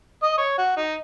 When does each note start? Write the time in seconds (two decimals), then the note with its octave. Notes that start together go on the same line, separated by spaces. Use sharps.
0.23 D#5
0.38 C#5
0.58 F#4
0.77 D#4